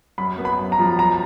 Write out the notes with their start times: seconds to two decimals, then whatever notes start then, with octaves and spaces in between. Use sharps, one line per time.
0.18 F#2 B5
0.38 B3
0.45 B5
0.59 F#2
0.72 A#5
0.79 F3
0.99 F#2 A#5